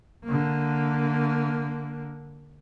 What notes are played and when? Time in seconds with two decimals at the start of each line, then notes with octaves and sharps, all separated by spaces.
0.25 D3 A#3